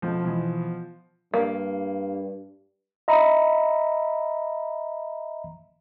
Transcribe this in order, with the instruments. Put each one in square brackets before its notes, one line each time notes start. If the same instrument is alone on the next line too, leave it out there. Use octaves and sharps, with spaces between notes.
[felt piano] F2 B2 [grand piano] F3
[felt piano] B2 E3
[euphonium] G2 [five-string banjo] A#3
[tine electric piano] D#5 E5 A#5 B5